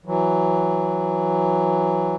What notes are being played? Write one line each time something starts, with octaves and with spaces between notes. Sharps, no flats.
E3 F#3